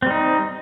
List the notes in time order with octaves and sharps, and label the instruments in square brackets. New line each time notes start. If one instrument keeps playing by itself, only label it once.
[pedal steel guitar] C4
G3
D#4